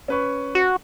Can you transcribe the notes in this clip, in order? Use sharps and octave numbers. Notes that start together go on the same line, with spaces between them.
C#4 B4 C#6
F#4